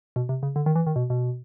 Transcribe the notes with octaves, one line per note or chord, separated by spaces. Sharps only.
B2
C3
C#3
D3
D#3
E3
D#3
B2
B2